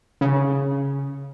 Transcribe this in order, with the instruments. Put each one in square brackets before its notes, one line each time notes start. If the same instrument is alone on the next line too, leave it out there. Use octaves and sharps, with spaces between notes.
[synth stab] C#3